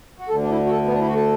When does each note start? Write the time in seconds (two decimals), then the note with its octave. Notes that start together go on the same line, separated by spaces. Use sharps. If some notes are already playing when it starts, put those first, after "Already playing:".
0.19 F#4
0.29 D2 A4
0.32 D3
0.43 D4
0.50 E4
0.66 F#4
0.71 A4
0.85 B3
0.92 D4
0.99 E4
1.07 F#4
1.15 A4